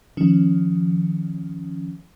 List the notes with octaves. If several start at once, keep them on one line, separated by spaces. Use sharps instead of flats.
D#3 F3 C#4